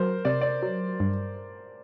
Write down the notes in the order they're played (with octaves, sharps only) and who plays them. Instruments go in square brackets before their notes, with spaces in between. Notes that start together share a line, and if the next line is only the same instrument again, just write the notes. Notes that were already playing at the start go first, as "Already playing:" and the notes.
Already playing: [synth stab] F#3 [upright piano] A#4 C5
[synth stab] C3 [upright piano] D5
[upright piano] D5
[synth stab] F#3
G2